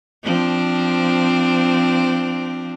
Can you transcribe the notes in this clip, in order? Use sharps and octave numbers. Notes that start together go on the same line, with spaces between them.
F3 C4 D4